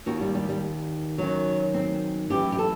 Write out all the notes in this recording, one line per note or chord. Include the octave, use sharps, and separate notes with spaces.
D#2 D#3 F#4
G3
G3
G3
F#2 D#3 F#3
C4
F#2 E3 G4
G4
A4